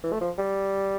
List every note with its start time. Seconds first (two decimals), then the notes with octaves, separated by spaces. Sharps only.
0.04 E3
0.12 A3
0.21 F3
0.38 G3